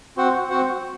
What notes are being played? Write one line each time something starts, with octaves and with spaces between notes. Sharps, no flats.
C4 F#4 C5 F#5
C4 F#4 C5 F#5